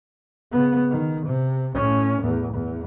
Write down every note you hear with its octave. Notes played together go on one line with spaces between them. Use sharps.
C#3 B3
D#3
C3
A2 C#4
E2 A2
E2